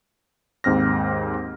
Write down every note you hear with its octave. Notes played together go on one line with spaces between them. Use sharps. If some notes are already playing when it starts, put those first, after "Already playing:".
D#2 G#2 C4 F6 A#6